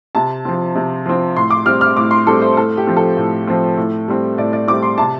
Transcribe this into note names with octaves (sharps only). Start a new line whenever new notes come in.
C3 A5
F3 C4
C3
F3 C4
A2 C6
D6
G3 C4 F6
F6
A2 D6
C6
G3 C4 A4
C5
A2 A4
G4
F3 C4
A4
A2
F3 C4
A2
G3 C4
A2 D5
D5
G3 C4 D6
C6
C3 A5